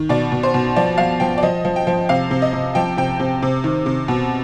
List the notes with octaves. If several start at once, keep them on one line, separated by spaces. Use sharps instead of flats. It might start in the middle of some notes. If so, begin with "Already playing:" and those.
Already playing: D#3
B2 D5
B2
C5
B2
F3 D5
F3 F5
F3 G5
D5
F3 D#5
F3
G5
F3
C3 F5
C3
D#5
C3
F3 G5
C3 G5
C3
C3
D#3
C3
B2